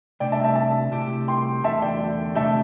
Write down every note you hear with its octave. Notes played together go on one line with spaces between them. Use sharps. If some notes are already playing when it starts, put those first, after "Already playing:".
C3 A3 D4 D5 G5
E5 A5
E5 A5
E5 A5
C3 A3 E4 G4
G5 C6
E2 D3 A3 E5 A5
D5 G5
C3 A3 D4 G4 E5 A5